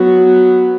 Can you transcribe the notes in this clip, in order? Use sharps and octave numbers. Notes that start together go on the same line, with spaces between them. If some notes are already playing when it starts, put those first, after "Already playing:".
Already playing: F#3 B3 F#4